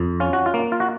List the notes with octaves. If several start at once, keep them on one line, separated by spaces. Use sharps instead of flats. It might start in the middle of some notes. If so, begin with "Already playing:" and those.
Already playing: F2
C#4 F4
F#4
F4
A#3
F4
F#4